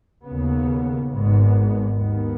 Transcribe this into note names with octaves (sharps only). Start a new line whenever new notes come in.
D#2 C#3 B3
G#1 G#2 G#3 B3
D#2 D#3 B3